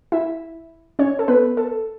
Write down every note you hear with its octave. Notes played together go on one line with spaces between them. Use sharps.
E4 E5
C#4 C#5
A4
B3 B4
A4